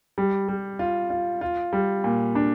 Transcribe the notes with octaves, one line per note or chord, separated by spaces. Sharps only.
G3
G3
F4
F4
F4
G3
A#2
D4